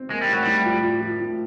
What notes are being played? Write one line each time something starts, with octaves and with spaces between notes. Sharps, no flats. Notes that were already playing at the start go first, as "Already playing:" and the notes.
Already playing: C4
G#3 A#3
G3
A2 F#3
A2 G3
F3
F3
F3
A2